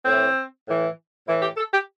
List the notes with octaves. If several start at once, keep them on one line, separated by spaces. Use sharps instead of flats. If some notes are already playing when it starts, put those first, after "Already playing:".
A2 E3 C4
A2 E3
A2 E3 E4
G4
A4
G4